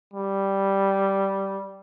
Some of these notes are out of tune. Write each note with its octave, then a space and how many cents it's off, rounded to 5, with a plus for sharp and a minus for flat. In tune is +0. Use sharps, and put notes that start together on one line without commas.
G3 -5